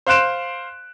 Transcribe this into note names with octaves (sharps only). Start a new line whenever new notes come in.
C5 F5 C6 F#6 D7 E7